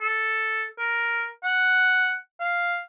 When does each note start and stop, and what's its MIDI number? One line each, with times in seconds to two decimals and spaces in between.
0.01 0.65 69
0.79 1.29 70
1.44 2.15 78
2.40 2.81 77